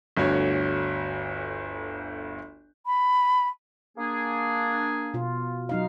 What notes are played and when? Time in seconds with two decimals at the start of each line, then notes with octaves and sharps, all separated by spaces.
0.17 G1 D2 F#4 C#5
2.86 B5
3.98 A#3 D4 G#4
5.14 B2 F4
5.69 F#3 D#4 F5